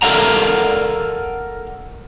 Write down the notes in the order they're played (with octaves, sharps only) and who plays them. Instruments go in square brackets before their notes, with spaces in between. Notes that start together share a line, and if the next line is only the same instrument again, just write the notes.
[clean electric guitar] A4 A#4 D5 F5 F#5 A#5